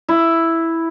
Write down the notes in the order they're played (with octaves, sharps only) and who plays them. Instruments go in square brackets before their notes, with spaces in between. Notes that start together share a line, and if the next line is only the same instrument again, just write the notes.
[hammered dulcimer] E4